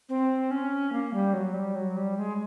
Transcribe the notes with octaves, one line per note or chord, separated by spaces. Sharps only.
C4
C#4
A#3
G3
F#3
G3
F#3
G3
G#3